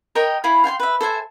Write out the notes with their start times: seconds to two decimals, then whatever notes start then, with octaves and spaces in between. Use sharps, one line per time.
0.15 A#4 C#5 D#5 G5
0.44 E4 F5 G#5 B5
0.64 F5 G5 G#5 C6
0.80 B4 E5
1.01 A4 C5 E5 G#5